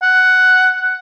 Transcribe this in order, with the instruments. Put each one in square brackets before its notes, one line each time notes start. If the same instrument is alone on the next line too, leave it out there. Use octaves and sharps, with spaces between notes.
[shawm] F#5